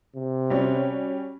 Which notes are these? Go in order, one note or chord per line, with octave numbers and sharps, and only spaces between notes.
C3
G3 C#4 F#4